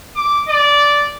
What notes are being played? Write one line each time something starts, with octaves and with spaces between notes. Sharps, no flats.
D6
D5